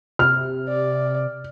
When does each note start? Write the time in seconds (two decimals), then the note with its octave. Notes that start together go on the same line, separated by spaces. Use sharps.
0.19 C3 F6
0.68 D5